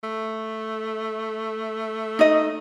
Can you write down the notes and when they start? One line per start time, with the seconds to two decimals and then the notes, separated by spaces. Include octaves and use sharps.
0.04 A3
2.19 D#4 D#5